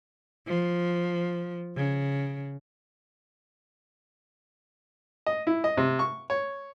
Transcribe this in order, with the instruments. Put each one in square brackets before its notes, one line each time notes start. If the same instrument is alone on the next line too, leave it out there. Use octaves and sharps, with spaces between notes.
[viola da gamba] F3
C#3
[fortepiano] D#5
E4
D#5
C3
C#6
C#5